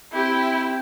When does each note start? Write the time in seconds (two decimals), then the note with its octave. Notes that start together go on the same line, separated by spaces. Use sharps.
0.12 C4 E4 G4